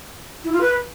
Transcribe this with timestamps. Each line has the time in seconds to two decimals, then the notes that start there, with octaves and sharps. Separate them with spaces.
0.44 E4
0.53 F4
0.61 B4